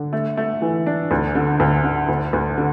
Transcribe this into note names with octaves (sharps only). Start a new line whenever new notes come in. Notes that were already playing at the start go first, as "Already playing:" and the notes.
Already playing: D3
A3
A3
E3
D4
D2
D3
D2
D3
D2
D2
D3